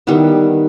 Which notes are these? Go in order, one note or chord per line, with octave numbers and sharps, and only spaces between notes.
D#3 G3 B3 E4